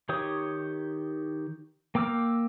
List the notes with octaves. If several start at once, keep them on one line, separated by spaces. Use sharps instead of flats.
D#3 G4 C#5 D#6
A#3 G5 D6 E6 F6